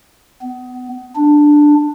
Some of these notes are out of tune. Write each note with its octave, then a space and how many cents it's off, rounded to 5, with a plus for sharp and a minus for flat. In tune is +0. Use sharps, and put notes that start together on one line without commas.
B3 +25
D4 +5